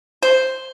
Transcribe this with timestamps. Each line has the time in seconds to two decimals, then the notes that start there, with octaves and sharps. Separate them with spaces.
0.23 C5